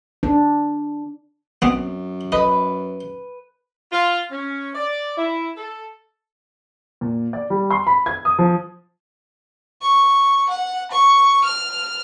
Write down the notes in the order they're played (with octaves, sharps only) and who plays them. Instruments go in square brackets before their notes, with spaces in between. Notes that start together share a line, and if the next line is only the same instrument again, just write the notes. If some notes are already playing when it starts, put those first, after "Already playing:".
[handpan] D4
[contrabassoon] F#2 [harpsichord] B3 C4
[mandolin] B4 [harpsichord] D#5
[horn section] F4
C#4
D5
E4
A4
[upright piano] A#2
D5
G3
C6
B5
G#6
D#6
F3
[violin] C#6
F#5
C#6
F6